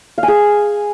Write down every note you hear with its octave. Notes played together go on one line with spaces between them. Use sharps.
F5
G#5
G#4